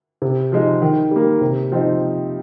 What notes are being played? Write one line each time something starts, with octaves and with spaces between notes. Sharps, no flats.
C3
F3 G#3 D#4
D#3
G3 A#3
C3
F3 C4 D#4